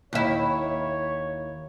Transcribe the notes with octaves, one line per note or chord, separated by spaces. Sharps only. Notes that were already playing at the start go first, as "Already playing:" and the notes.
D#2 E4 C#5